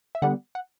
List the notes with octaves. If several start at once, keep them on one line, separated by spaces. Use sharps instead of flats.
E5
D3 G3 B3 F#5
F#5